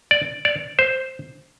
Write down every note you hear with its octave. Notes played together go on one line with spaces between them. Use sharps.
D5
D5
C5